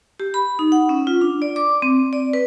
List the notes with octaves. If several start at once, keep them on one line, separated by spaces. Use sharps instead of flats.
G4
B5
D#4
F#5
C#4
F4
D4
D5
D6
C4
D5
B4